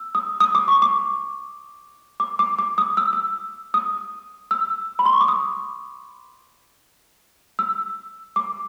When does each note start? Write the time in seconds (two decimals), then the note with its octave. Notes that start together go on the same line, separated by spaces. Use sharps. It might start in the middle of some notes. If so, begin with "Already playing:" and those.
Already playing: E6
0.15 D#6
0.40 D#6
0.55 D6
0.68 C#6
0.82 D6
2.20 D6
2.39 D6
2.59 D6
2.78 D#6
2.97 E6
3.13 E6
3.74 D#6
4.51 E6
4.99 B5
5.06 C6
5.13 C#6
5.21 D6
5.28 D#6
7.59 E6
8.36 D6